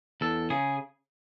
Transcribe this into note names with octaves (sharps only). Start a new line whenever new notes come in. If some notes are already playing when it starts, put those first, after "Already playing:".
E2 A4
C#3 G#4